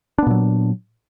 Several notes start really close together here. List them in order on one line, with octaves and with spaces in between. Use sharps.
D4 B3 A#2 F#3